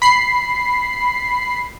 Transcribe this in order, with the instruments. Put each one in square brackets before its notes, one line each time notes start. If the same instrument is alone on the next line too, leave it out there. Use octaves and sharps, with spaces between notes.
[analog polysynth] B5 C7